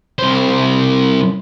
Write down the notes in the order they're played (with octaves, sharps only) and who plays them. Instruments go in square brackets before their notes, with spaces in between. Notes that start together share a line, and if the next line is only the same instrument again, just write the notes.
[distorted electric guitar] C2 C5